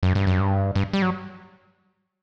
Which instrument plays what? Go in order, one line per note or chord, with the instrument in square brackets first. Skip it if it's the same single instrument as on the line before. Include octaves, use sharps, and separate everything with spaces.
[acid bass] F#2
G2
F#2
G2
G2
G3
F#3